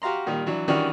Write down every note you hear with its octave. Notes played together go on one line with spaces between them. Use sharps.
F#4 G4 F5 A#5 C6
A#2 D#3 G3
E3 F#3 D4
D#3 E3 G3 C#4 D4 F#4